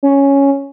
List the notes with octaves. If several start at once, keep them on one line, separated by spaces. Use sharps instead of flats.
C#4